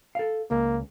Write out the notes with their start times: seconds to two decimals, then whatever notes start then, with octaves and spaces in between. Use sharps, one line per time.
0.15 A4 F5
0.51 C#2 A#3